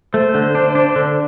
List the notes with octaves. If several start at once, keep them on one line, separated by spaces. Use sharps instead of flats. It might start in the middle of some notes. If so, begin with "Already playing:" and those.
A3 C5
D3
D4
D4
D3